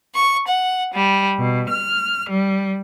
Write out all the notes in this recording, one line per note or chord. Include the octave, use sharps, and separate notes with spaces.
C#6
F#5
G3
B2
F6
G3